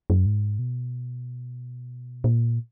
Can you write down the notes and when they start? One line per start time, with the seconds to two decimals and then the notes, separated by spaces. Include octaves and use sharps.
0.10 F#2
0.26 G#2
0.59 B2
2.24 A#2